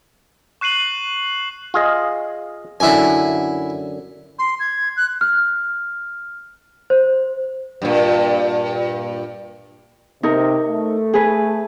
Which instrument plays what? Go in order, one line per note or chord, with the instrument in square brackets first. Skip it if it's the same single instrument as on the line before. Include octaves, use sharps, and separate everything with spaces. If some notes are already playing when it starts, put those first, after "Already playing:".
[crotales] C#6 F#6 C7 D#7 F#7
[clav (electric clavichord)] F4 G#4 D#5
[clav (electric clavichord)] F#2 D3 [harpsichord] E4 G#5
[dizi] C6
G#6
F#6
[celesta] F6
C5
[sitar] G2 A#2
[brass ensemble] C3 [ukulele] D#4 A#4
[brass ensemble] A3
[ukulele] G#4 B4